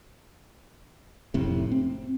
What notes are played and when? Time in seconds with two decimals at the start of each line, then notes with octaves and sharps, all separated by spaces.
1.34 F1 A2 C3
1.71 C4